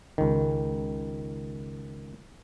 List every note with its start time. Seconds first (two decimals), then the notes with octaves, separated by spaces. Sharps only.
0.18 C#2 D#3